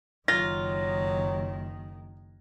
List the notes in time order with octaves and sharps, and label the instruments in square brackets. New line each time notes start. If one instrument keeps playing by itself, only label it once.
[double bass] F#1 D#3 [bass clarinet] F#3 [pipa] F4 [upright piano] A#6